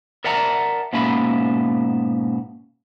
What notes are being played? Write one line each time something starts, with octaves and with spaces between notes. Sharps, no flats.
A#4 D5 E5 F#5 A5 A#5
G#2 B2 A#3 C#4 E5 B5